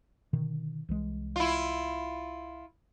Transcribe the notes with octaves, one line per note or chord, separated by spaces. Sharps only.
B2 D3 D#3
C2 E3 G#3
E4 F4